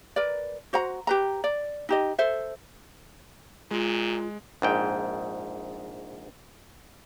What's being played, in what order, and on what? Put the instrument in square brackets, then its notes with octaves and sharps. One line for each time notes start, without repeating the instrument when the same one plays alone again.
[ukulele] A#4 B4 D5
F#4 C5 F#5 A#5
G4 B4 A#5
D5
D#4 G4 D#5
A4 C5 E5
[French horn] A#2 [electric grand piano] G#3 [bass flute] F4
[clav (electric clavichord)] A#1 G#2 G5